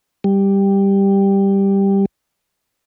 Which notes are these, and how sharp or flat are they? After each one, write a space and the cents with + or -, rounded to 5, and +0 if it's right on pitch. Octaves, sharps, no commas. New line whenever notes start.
G3 +5